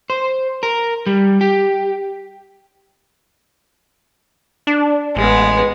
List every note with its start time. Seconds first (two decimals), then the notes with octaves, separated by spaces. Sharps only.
0.10 C5
0.63 A#4
1.06 G3
1.41 G4
4.67 D4
5.16 A1 G#3 B3